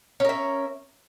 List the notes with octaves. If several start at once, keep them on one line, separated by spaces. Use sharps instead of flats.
C#4 A#4 E5